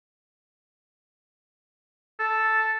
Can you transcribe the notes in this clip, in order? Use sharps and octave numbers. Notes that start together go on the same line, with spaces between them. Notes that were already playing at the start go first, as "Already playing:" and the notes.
A4